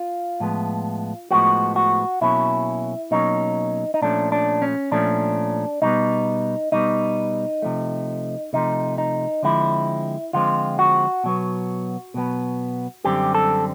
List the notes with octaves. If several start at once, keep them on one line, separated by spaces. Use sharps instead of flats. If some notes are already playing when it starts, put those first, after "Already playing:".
Already playing: F4
A2 F3 G#3 B3
A2 F3 G#3 B3 F#4
F#4
B2 F#3 A#3 C#4 E4
B2 F#3 A#3 C#4 D#4
D#4
A#2 F3 A3 C#4 D4
D4
C#4
A#2 F3 A3 C#4 D4
B2 G3 B3 D#4
B2 G3 B3 D#4
C3 F3 A3
C3 F3 A3 D#4
D#4
D3 F3 G#3 C4 E4
D3 F3 G#3 C4 F4
F#4
B2 F#3 B3
B2 F#3 B3
F#2 D3 G3 C4 G4
A4